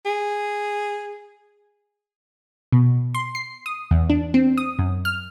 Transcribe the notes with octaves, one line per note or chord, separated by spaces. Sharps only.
G#4
B2
C6
C7
D#6
E2
D4
C4
D#6
F#2
F6